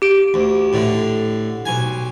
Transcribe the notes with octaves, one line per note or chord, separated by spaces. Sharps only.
G4 D7
D2
A2 D3
B1 G#5